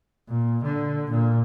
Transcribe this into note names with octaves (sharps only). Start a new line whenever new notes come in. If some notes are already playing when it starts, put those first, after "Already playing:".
A#2
D3
A#2